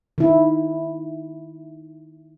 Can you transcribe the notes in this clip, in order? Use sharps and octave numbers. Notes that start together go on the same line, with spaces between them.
D#3 E4